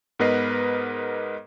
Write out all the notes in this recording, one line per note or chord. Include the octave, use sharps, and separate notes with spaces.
G#2 B3 A#4 B4 D#5 C7